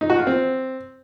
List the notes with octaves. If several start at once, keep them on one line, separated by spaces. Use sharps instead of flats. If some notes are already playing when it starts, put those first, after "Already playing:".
D#4
F#4
F4
C4